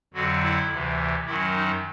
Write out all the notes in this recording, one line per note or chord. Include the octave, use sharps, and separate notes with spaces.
F2 D3 F#3 F#4
E4
D2 C3 E3
F#2 D#3 F#3 E4
D#4